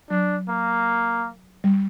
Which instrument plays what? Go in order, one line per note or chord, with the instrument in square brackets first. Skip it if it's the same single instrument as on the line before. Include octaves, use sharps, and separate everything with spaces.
[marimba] F#3 [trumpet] D4
[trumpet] A#3
[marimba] G3